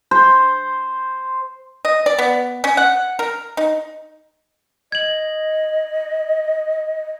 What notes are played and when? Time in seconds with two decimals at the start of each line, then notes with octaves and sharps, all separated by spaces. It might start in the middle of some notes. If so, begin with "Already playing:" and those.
0.11 C5
1.85 D#5
2.06 D5
2.18 B3
2.64 C#4
2.77 F#5
3.19 A#4
3.57 D#4
4.92 D#5 G#6 F#7